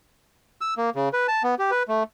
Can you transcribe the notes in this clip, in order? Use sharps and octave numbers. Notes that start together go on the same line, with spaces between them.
E6
A#3
C#3
B4
A5
B3
G4
B4
A3